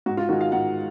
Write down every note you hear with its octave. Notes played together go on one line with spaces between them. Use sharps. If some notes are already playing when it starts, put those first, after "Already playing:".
G#2 F#4
F4
D#3 G#3 F#4
F5
G#2 F#5